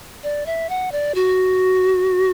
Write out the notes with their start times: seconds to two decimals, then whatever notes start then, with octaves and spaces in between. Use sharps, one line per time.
0.23 D5
0.46 E5
0.69 F#5
0.92 D5
1.15 F#4